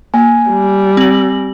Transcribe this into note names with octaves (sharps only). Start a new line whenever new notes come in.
A#3 G#5
G3
C4 F#7